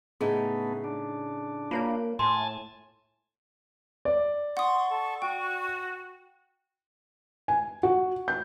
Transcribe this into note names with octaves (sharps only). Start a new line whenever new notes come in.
A2 C#3 A3 B3 D#4 G#4
D4
A#3 F4 C#5 A5
A2 G#5 A5 C6
D5
F#5 C6 C#6 D#6
A4
F#4 G5
G#5
F#4
G6